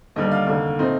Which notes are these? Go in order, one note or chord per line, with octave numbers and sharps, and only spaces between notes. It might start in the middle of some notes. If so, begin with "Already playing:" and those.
D#2 D3 G3 D4 D#5
F5
F1 D#2 D3
A#2 A3 C4 D#4